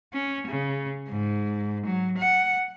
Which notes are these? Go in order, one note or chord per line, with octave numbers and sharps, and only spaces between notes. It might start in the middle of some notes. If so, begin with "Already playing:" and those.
C#4
C#3
G#2
F#3
F#5